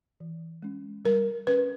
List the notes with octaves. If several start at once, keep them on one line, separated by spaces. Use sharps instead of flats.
E3
G#3 C#4
G3 A#4
C#4 B4